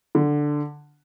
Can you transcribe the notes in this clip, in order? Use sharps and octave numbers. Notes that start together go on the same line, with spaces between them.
D3